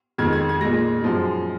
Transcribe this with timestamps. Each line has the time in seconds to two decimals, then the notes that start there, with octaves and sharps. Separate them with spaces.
0.18 F2 D#3 G#3 G#6
0.33 G#6
0.49 G#6
0.61 A#2 G#3 A#6
1.01 F#2 F3 G#3